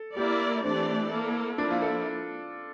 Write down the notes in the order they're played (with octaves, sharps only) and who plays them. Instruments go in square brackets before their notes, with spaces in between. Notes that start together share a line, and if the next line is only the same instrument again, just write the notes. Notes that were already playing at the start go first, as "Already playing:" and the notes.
Already playing: [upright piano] A4
[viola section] A#3 E4 A#4 D5 [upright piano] G4
[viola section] E3 A3 D4 G4 D5 [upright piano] C4
[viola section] A#3 E4 A4
[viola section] F3 A#3 E4 [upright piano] D4
[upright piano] F4
A4